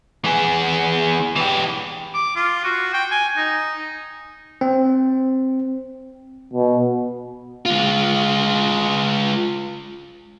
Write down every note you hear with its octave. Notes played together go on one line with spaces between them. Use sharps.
E3 G#4
E3 G4
D6
F4
F#4
G5
G#5
D#4
C4
B2
G#3 F4